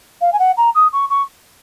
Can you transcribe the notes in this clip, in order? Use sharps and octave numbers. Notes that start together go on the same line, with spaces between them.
F5
G#5
F#5
A#5
D#6
C#6
C#6